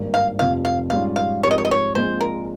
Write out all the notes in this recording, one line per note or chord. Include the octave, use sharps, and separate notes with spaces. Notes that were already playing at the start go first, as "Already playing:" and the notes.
Already playing: G#1 G2 D#3 A#3
F5
F1 F2 C3 F3 C4 F5
F5
G#2 G3 C#4 F4 F5
F5
G#2 F3 C4 G4 A#4 C#5
D#5
C#5
D#5
C#5
A#1 A#2 G#3 C4 F4 C5
A#4